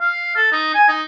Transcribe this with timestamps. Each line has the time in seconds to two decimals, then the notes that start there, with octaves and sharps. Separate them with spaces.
0.01 F5
0.36 A4
0.52 D#4
0.74 G#5
0.88 D#4